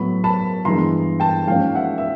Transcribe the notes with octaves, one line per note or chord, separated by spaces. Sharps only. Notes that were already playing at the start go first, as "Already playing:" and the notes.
Already playing: A2 F#3 B3 B5
A5 B5
G2 E3 G#3 B3 A#5 C6
G5 A5
G#2 F3 A#3 C#4 F5 G5
E5 F#5
E5